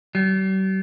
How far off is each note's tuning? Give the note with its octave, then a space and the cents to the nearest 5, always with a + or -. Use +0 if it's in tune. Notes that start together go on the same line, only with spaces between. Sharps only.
G3 -45